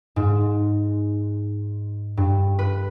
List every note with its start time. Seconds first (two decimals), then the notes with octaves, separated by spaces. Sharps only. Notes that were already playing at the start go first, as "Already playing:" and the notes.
0.16 G#2
2.17 G2
2.59 B4